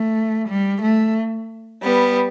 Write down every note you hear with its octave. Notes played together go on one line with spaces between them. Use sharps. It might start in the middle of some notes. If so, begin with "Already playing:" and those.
Already playing: A3
G3
A3
G3 B3